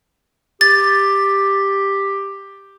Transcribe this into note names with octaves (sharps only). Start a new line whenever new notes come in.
G4 A6